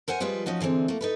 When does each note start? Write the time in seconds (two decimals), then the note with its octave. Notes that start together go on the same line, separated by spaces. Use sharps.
0.08 A#4 C5 F#5 G#5
0.20 F3 G3 G#3 F4 B4 C5
0.46 F3 C#4 D#4 F#4
0.60 D3 E3 G#3 C4 D4
0.88 A3 A#3
1.01 D#4 A4 B4